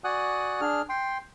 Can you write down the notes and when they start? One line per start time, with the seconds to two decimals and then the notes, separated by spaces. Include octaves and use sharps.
0.04 F#4 D5 F#5 G#5 D#6 F#6
0.61 D4 G#4 F6
0.89 G5 C6